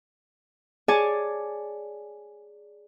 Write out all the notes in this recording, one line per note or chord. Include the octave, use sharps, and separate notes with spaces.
G#4 C#5 D5 G#5 A5